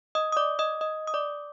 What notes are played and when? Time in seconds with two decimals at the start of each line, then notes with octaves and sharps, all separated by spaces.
0.15 D#5 D#6
0.32 D#6
0.37 D5 D6
0.59 D#5 D#6
0.81 D#5 D#6
1.07 D#6
1.14 D5 D6